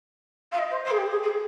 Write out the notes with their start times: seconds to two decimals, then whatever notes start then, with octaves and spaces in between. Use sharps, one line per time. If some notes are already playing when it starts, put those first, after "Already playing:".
0.52 F5
0.58 D#5
0.71 C5
0.84 C5
0.91 G#4
0.97 G4
1.11 G#4
1.23 G#4